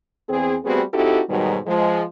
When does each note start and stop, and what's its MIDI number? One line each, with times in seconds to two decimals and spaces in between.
0.29 0.56 40
0.29 0.56 60
0.29 0.56 68
0.64 0.82 55
0.64 0.82 57
0.64 0.82 59
0.64 0.82 60
0.64 0.82 66
0.64 0.82 68
0.94 1.21 60
0.94 1.21 63
0.94 1.21 64
0.94 1.21 66
0.94 1.21 67
0.94 1.21 69
1.30 1.58 44
1.30 1.58 47
1.30 1.58 51
1.30 1.58 54
1.30 1.58 55
1.67 2.03 53
1.67 2.03 56